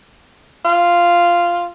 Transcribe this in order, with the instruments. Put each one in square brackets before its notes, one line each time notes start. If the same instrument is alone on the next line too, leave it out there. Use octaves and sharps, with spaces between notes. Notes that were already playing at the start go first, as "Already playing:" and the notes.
[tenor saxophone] F4